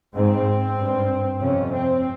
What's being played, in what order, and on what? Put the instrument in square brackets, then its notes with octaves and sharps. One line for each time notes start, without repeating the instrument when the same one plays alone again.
[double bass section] G#2 C4
G2
F2 C3 C#4
C4